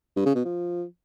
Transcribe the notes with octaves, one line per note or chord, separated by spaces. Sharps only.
G2
C#3
B2
F3